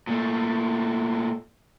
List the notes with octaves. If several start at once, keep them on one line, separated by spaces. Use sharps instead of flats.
A#2 A3